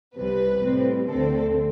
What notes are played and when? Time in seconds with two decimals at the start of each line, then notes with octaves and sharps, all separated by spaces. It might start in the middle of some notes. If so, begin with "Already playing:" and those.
0.16 C2 C3 G3 B4
0.61 A2 G3 C4
1.08 D2 D3 A3 C4 A4